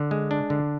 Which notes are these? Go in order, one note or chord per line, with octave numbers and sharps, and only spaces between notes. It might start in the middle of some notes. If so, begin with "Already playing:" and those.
Already playing: D3
G#3
D4
D3